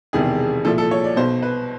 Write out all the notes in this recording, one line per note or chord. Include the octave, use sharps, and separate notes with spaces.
E1 E2 C3 D#3 G#4
C2 A#2 F3 A4
A4
C#5
D5
B1 B2 C5
B4